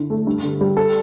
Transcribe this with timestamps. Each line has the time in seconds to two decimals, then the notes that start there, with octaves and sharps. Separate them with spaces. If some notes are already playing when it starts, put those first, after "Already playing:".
Already playing: D3 E4
0.10 A3
0.27 G2
0.43 D3
0.61 G3
0.77 A4